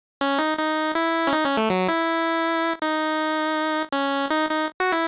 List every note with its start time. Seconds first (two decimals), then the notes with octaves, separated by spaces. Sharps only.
0.21 C#4
0.39 D#4
0.58 D#4
0.95 E4
1.27 C#4
1.33 D#4
1.45 C#4
1.57 A3
1.70 F#3
1.88 E4
2.82 D#4
3.92 C#4
4.30 D#4
4.50 D#4
4.80 F#4
4.92 E4